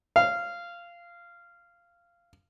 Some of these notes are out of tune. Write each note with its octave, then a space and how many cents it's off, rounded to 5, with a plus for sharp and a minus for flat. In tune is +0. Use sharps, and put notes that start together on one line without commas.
F5 -15